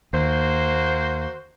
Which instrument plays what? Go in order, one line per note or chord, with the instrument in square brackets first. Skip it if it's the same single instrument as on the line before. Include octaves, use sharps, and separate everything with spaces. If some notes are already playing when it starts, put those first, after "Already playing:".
[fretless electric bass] D#2 [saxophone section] A#3 F#4 C5